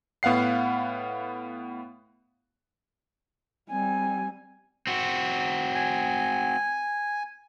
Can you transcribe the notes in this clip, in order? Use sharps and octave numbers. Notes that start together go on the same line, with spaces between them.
A2 B3 F5 F#5 C7
G3 C4 G#5
C4 F#4
G#5